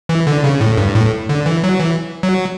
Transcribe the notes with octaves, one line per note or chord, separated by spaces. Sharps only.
E3
D3
C#3
A2
G2
A2
D3
E3
F#3
E3
F#3